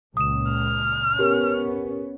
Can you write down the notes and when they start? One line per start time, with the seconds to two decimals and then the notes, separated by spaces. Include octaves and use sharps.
0.17 C#2 A#2 D#6 E7
0.52 F6
1.19 B3 C#4 G4 A#4